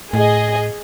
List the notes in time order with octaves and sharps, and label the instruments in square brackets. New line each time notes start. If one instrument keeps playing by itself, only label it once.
[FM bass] A2 [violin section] G#4 D#5